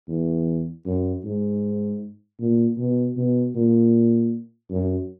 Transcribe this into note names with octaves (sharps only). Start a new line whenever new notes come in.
E2
F#2
G#2
A#2
B2
B2
A#2
F#2